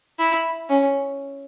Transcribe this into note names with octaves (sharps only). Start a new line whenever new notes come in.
E4
C#4